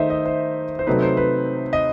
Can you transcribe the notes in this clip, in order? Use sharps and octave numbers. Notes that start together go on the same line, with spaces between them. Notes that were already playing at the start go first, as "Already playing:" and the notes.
Already playing: D#3 A3 D#4 C5 D#5 E5
D#5
C5
C5
C3 F#3 A3 C4 D#4 B4
C5
B4
D#5